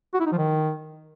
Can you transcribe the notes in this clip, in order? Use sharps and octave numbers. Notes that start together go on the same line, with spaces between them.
F#4
E4
D#4
F3
D#3